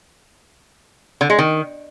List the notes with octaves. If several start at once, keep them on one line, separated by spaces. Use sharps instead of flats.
D3
G#3
D#3